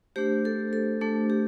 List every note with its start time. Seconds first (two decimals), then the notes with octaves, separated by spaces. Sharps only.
0.16 A3 D4 G4 C5
0.45 A4
0.73 A4
1.01 A3 D4 A4
1.30 G4